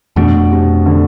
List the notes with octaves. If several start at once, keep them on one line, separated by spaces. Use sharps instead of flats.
F2 B2 E3 A3 D4
C3
D3